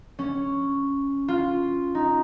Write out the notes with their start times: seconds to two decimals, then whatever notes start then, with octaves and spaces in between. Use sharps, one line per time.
0.19 C#4
1.28 F4
1.95 D#4